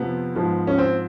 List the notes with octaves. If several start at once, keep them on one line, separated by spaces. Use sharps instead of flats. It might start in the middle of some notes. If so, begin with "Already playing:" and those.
Already playing: F2 C3 F3 B3
G#2 F3
C#4
C4